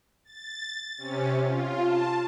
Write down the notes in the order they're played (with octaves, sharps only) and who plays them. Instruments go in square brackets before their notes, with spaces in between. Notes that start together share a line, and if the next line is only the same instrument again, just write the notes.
[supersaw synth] A6
C3 C#4
F4
A5